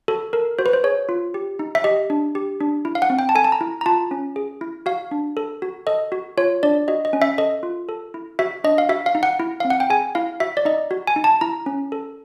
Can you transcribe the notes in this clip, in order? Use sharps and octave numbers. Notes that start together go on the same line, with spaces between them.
F#4 A4
A4 A#4
F#4 C5
B4
C5
G#4 C#5
F4
G4
D#4
E5
G4 D#5
D4
G4
D4
E4
F5
F#5
C4
G5
A5
A4 G#5
A5
A#5
E4
A#5
F4 A5
C#4
G#4
E4
F#4 F5
D4
A4
F#4
A4 D#5
F#4
F4 C#5
D4 D5
F#4 D#5
D#5
C#4
E5
A4 D#5
F4
A4
E4
F#4 E5
D4 D#5
F5
F#4 E5
F5
D#4
F#5
E4
C4 F5
F#5
G5
G#4 G#5
E4 F5
F#4 E5
D5
D#4 D#5
F#4
G#5
D#4
A5
E4 A#5
C#4
A4